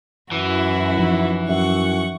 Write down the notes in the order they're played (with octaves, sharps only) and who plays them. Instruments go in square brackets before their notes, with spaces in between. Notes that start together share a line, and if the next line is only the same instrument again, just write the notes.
[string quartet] F#2 E4 F#4 [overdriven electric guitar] E3
[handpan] F3 D#4
[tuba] F#2 [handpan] E5 [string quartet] F#5 C#6